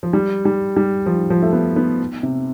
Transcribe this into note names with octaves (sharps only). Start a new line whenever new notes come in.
F3
G3
G3
G3
F3
F3
A3
B3
B3
C3